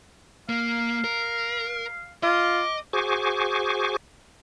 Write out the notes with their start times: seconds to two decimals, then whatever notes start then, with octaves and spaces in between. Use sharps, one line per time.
0.49 A#3 F5
1.04 A#4
2.23 F4 D#5 D6
2.93 F#4 G#4 C5 G#5 C#6 D6